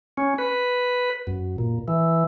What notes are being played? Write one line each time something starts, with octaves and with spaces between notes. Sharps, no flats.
C#4
B4
F#2
A#2
E3